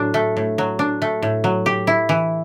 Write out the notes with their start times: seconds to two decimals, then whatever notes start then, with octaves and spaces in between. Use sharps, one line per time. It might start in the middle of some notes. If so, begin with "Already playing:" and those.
Already playing: A2 F#3 D4
0.14 A3
0.37 A2
0.58 F#3
0.79 D4
1.02 A3
1.22 A2
1.44 F#3
1.66 G4
1.87 E4
2.09 E3